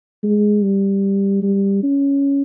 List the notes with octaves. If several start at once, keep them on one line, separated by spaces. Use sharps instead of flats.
G#3
G3
G3
C#4